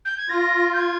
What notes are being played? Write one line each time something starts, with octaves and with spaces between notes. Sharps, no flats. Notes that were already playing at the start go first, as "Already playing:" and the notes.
G6
G#6
F4 A#6
G6
G#6